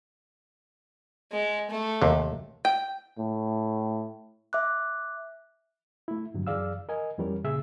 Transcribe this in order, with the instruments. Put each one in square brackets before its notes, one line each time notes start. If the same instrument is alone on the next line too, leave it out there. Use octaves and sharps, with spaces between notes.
[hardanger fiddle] G#3
A3
[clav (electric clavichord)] D#2 C3
[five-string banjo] G5
[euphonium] A2
[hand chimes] E5 D6 F#6
[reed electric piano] A3 E4
G2 D3 F#3
F#2 E3 G#4 D5 F5 E6
A#4 D#5 G#5
F2 E3 G3 C#4 A#4 C#5
A#2 C#3 G#4 E5 E6